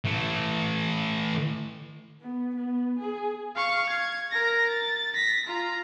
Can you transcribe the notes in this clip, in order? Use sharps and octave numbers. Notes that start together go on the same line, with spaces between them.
E3 A3
B3
B3
G#4
F5 C#6
G#6
A#4 A#6
A6
A#6 B6
F4 A#5